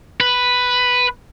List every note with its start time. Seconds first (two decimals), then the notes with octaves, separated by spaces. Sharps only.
0.20 B4